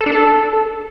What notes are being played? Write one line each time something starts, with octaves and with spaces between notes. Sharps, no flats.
A4
D4
A4